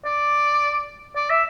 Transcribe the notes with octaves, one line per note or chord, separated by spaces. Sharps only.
D5
D5
E5